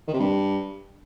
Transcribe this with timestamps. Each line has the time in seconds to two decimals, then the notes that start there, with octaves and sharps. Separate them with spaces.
0.08 D#3
0.14 C3
0.19 G2